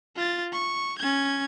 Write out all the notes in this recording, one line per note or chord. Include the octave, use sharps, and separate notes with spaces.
F4 A6
C#6
C#4 G#6